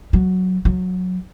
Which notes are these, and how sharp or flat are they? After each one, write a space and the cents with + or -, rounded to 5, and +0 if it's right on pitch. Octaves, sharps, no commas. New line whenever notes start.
F#3 +0
F#3 -15